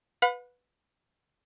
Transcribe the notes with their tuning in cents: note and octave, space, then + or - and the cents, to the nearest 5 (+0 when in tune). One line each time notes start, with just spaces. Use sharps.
B4 +0 F#5 -45 B5 +20